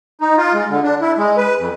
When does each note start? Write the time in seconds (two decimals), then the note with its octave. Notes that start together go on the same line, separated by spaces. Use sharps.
0.21 D#4
0.37 F4
0.54 G#3
0.70 D3
0.83 D4
1.01 E4
1.17 G#3
1.37 B4
1.58 F2